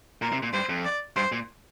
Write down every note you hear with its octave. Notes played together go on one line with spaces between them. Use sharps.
A#2 A#4
C3
A#2
G2 C5
F2
D5
G2 C5
A#2